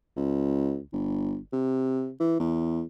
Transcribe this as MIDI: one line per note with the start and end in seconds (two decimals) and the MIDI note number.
0.17 0.80 37
0.93 1.38 31
1.53 2.11 48
2.20 2.37 52
2.40 2.83 40